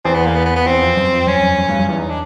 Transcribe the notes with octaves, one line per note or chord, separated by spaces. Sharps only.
E2 C4
B3
A#3
B3
B3
B3
E2 C4
F2
F#2
F2
F#2 C#4
F#2
F#2
G2
F#2
E2 C#4
D#4
D4